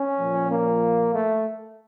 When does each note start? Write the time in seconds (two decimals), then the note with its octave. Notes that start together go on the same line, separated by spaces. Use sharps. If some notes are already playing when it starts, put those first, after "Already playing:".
Already playing: C#4
0.18 A#2 F3
0.50 A#3
1.13 A3